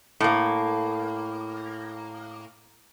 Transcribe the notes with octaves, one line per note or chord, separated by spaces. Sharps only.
A2 A#3